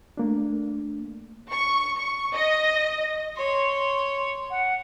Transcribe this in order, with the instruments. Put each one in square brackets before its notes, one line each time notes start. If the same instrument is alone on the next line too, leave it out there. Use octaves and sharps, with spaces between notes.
[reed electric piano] A3 A#3 D4
[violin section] C#6
C#6
D#5
[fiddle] C#5 [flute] C6
[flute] F#5